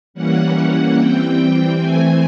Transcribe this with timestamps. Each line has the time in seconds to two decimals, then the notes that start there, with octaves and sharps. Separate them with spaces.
0.14 E3 G3 A#3 C#4 F#5
0.95 E3 G3 C4 G5
1.77 E3 A3 C4 G#5